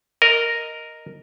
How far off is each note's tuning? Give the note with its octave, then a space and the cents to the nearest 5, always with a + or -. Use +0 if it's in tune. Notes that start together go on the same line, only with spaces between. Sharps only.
A#4 +0 D#5 +0